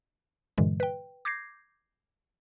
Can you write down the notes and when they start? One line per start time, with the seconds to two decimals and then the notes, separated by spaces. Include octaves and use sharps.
0.58 G2 A#2 D3 E3 G#3
0.80 B4 G5
1.25 D6 G6 G#6 A#6 C7